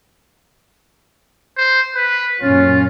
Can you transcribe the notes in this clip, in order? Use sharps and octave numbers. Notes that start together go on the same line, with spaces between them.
C5
B4
F#2 A#2 C#4 F4